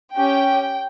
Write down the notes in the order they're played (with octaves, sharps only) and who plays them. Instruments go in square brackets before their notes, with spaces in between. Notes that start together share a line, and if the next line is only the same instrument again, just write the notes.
[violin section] C#4 G4 G5